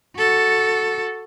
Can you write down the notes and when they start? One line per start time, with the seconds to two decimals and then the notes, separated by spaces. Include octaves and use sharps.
0.17 F#4 A4